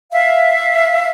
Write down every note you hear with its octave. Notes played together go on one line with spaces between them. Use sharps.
E5 F5